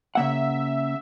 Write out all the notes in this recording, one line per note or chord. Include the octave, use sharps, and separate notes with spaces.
C#3 A#3 E5 F#5